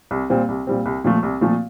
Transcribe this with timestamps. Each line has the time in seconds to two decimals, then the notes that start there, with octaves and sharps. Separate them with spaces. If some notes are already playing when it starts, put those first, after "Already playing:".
0.11 C2
0.30 A#2 G3 C4
0.49 C2
0.67 A#2 G3 C4
0.86 C2
1.04 A#2 F3 A3
1.23 C2
1.41 A#2 F3 A3